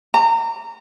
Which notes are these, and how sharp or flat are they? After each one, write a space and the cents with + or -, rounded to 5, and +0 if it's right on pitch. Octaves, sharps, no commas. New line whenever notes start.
A#5 -30